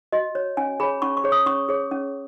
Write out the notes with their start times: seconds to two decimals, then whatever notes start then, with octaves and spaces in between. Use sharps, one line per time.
0.12 F#4 D#5
0.35 C#5
0.57 C#4 G#5
0.80 G#4 C#5 B5
1.02 C#4 C#6
1.17 C#6
1.24 G#4 C#5
1.32 D#6
1.46 C#4 C#6
1.69 G#4 C#5
1.91 C#4